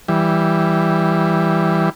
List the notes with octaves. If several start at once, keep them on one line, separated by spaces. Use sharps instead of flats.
E3 G3